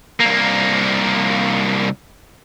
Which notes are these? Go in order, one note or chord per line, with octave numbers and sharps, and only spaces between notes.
C2 A#3